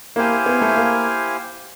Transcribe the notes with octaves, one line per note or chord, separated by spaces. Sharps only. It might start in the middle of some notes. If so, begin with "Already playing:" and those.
A#3 E4 G4 C5 F5 G#5
B3
A3
A#3